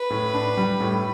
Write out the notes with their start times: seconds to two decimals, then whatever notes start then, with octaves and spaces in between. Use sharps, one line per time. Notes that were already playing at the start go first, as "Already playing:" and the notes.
Already playing: B4
0.10 A2
0.34 D4
0.57 G3
0.80 A2